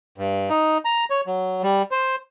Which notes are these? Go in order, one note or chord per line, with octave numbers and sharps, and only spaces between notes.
G2
D#4
A#5
C#5
F#3
G3
C5